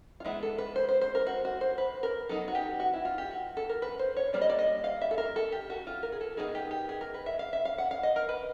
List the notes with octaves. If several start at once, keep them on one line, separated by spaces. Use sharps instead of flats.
F4
E3 G#3 B3 D4 E4
A4
B4
C5
C5
C5
A#4
F#4
F#4
C5
B4
A#4
F#3 B3 D#4 A4
F#4
G4
F#4
E4
F4
G4
F#4
A4
A#4
B4
C5
C#5
G3 A#3 D4 D5
D#5
D5
D#5
F5
E5
A4
A#4
A4
G4
F#4
F4
A#4
G#4
A4
D#3 F#3 B3 D#4 G#4
G4
G4
G#4
A#4
B4
E5
F5
E5
F5
F#5
F5
D#5
A#4
B4